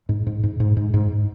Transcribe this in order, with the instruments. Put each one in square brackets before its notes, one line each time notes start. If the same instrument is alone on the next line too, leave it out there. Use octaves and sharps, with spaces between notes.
[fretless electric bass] G#2
G#2
G#2
G#2
G#2
G#2